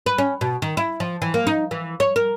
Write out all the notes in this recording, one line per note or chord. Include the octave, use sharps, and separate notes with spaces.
B4
C#4
B2
D#3
E4
F3
E3
A#3
D#4
E3
C#5
A#4